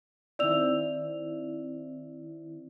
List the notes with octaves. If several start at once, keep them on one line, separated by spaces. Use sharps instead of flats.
D#3 C4 E4 D5 E6 F7